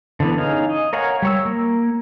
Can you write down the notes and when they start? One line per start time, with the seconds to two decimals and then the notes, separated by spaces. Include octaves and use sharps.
0.20 D3 E3 B3
0.38 C#4 D#4 G#4 F5
0.69 D#5
0.93 A#4 C#5 F5 F#5 G#5
1.22 G3 C#5 E6
1.45 A#3